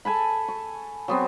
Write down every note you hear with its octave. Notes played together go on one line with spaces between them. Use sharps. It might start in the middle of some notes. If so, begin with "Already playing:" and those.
A4 G#5 A5 B5
C#6
F#3 B3 C4